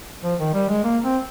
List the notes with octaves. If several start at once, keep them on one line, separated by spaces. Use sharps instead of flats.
F3
D#3
G3
G#3
A#3
C4